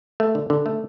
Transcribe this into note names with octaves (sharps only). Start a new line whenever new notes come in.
A3
D3
D3
A3